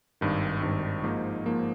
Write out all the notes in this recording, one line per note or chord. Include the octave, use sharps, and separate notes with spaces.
G#1 G2 D#3
G#1 G2 D#3
G#2 F3 A#3 D#4
G#2 F3 A#3 D#4